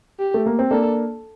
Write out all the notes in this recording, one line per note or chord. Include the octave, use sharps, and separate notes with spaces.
G4
A3
A#3
C4
A#3 D4 A4